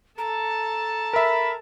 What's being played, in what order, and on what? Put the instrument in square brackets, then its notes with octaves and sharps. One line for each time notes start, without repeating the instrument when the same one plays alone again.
[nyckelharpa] A4 A5 [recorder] A#5
[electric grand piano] A#4 E5 [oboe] B5